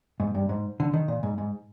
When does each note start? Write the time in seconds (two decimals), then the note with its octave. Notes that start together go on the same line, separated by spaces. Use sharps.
0.20 G#2
0.35 G2
0.49 G#2
0.80 D3
0.93 D#3
1.08 A#2
1.23 G#2
1.38 G#2